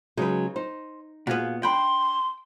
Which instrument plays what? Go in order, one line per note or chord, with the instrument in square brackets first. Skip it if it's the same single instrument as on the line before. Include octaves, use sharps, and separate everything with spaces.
[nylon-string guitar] C#3 F#3 G#3 [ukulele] D#4 B4
[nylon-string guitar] D#4 [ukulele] C5
[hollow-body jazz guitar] A#2 B3 [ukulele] F#4 G#4 F5
[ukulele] D4 B5 [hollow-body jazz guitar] G5 [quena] C6